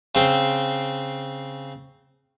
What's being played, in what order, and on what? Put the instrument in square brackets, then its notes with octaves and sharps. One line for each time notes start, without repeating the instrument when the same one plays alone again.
[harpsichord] C#3 C4 C6